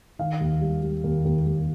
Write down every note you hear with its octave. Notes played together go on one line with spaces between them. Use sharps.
D#3 F5
D#2
G3
G3
D#2
D#2
D#2